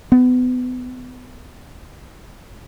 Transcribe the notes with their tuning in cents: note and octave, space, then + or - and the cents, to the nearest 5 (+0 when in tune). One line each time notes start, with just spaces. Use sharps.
B3 +30